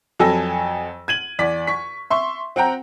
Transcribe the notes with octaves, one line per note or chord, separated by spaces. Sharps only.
F2 F#3 A4 G#5 E6 A#6
G#6 D#7 F#7
E2 D5 B6
C#6 B6
E5 C6 C#6
C4 F#5 G5 A#5